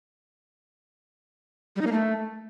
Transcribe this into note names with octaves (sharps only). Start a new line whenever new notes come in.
G3
D#4
A#3
A3